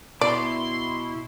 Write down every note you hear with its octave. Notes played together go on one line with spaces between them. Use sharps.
B2 E4 D5 C6